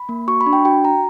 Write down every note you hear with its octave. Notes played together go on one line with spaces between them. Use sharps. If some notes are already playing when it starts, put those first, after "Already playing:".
Already playing: B5
A#3
F#4 C#6
B5
D4
G5
F#4 G5
F#4 A#5